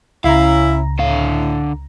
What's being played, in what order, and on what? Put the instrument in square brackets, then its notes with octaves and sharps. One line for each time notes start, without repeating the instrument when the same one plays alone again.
[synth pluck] C#2 C#3 A#5 [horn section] C#4 E4 [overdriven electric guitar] F5
[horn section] A2 [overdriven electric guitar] D3 F5